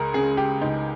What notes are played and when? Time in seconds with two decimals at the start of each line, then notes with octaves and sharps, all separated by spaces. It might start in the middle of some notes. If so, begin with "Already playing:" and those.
Already playing: C#2 G#4 A#4
0.14 C#3 G#4
0.37 G4
0.62 C#2 D#4